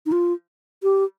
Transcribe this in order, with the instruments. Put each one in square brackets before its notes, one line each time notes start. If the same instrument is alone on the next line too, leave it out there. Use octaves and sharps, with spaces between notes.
[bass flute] D#4
F4
G4